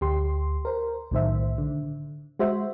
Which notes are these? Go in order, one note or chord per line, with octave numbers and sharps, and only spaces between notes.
D2 G4 C6
A#4 C5
B1 A2 D#3 C5 E5
D3
G#3 F#4 C5 E5